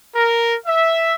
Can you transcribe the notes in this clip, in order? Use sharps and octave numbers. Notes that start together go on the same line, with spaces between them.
A#4
E5